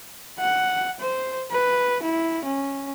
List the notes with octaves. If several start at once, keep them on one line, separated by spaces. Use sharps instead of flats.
F#5
C5
B4
E4
C#4